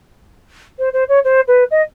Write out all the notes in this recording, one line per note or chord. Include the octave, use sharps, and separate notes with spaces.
C5
C5
C#5
C5
B4
D#5